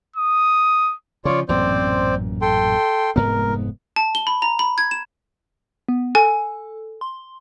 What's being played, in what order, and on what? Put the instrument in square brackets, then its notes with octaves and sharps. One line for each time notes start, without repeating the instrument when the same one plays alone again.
[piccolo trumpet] D#6
[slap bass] C#3 F3 [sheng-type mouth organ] F4 C#5 D5
[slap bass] A1 F#2 A#2 [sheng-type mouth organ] C4 C5 D5
[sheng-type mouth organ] A4 G5 C6
[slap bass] F1 G#2 B3 [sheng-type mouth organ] A#4
[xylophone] A5
G7
B5
A#5
B5
G#6
E7
[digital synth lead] B3
[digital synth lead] A4 [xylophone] G#5
[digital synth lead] C6